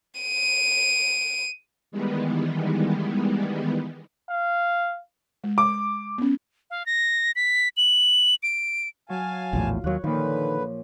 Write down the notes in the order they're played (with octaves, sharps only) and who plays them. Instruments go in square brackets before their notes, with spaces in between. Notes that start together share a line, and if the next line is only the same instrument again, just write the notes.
[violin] D7 D#7
[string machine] D#3 E3 G3 G#3 B3
[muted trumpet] F5
[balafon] G#3
[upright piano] D6
[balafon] B3 C#4
[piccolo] F5
A#6
B6
F#7
D7
[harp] F#3 [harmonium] F5 G#5 A5
[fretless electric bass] A#1 E2 A2 [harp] F4
[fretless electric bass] D#2 F#3 [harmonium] A#3 F4 [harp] C#5 F#6
[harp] A#2 F3 [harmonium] D3 B4 [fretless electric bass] D#3